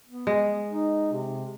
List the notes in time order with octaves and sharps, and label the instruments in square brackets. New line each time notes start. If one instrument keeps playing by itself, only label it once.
[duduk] B3
[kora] G#3
[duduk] D#4
C3